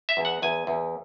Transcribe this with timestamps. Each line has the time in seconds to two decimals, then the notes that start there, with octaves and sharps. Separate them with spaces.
0.09 E5
0.17 E2
0.25 F#5
0.42 E2 G#5
0.67 E2